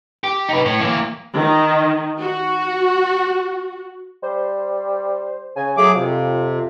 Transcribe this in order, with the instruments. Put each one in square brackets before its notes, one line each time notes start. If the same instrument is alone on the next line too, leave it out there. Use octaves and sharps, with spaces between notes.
[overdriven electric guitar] G4
D#4 B4
A2
E3 A#3
[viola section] D#3
F#4
[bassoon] G3 [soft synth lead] C5
[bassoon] C#3 [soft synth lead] G#5
[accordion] F#3 G#4 D6 [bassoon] A3
[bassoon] F2 [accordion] C3 [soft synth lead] F4